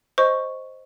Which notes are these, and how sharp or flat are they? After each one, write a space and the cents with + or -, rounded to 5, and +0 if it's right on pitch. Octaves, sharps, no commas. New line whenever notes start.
C5 +0 D#5 +0 C#6 +0